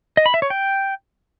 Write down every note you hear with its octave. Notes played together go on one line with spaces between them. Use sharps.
D#5
B5
E5
C#5
G5